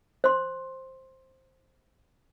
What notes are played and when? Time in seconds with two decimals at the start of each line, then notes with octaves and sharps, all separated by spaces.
0.24 C5 C6